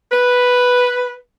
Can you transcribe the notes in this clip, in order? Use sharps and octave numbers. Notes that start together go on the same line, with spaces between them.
B4